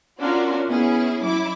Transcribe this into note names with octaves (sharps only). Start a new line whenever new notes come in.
C#4 D4 F4 F#4 A#4
B3 C#4 E4 G#4
F#3 E4 D6